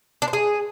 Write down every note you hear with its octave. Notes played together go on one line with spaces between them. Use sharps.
D4
C5
G#4